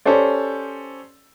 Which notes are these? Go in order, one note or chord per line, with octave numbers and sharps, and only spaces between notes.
C#4 G4 A4 C5 D5